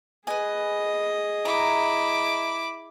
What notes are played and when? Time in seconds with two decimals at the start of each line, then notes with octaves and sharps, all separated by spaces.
0.27 G#4 B4 D#5 G#5
1.45 E4 A#5 D6